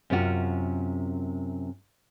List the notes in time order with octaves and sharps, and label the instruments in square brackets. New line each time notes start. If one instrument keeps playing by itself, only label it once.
[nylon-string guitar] F#2 C3 C#4 F4 F#4